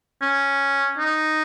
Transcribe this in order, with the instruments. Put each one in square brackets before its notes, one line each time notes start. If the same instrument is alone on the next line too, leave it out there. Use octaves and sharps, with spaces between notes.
[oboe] C#4
D#4